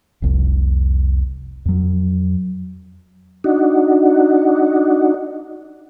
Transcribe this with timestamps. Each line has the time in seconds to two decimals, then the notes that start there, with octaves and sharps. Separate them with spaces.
0.22 F1 C2
1.65 F2 F#3
3.44 D4 D#4 F#4